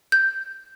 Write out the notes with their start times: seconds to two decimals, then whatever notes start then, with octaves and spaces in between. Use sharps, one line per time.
0.12 G6